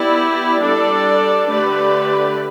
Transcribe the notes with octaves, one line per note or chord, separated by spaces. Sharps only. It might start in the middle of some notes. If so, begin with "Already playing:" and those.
Already playing: B3 E4 G4 D5
G3 D4 A4 D5
D3 A3 G4 B4 D5